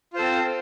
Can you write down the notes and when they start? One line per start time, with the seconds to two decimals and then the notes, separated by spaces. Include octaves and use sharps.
0.13 F4
0.16 C5
0.19 A4
0.21 C4